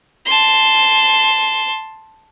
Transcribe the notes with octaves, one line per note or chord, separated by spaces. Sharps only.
A5 C6